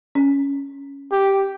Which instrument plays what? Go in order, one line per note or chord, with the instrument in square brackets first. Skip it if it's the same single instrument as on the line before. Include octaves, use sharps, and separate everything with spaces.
[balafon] C#4
[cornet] G4